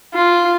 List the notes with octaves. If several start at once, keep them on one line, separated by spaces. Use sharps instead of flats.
F4